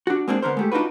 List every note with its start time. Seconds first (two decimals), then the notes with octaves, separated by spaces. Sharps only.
0.07 D4 F#4
0.28 G#3 A#3 C4 D4
0.42 D3 B3 A#4 C5
0.57 G#3 A3 G4
0.72 D4 D#4 F4 F#4 B4